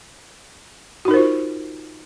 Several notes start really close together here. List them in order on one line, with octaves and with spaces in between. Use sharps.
F#4 D#4 A#4 C5 F4